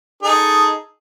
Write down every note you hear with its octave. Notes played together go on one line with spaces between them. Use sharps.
D#4 G#4 A4